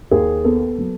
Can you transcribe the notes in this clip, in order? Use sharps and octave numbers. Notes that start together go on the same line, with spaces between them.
D#2 G#4
B3 A4
F#3